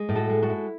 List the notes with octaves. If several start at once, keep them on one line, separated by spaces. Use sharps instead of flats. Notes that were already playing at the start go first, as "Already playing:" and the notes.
Already playing: G#3
A2
F#4 A4
G#3
F#4 A4
E4